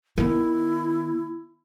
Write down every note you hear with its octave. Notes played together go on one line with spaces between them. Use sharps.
D#3 B3 E4